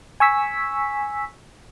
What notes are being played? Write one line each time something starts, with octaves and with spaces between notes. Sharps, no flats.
G#5 C#6 E6 B6